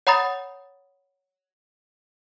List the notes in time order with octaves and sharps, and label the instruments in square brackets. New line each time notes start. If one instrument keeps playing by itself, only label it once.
[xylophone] C#5 F#5 A#5 B5 D#6 A6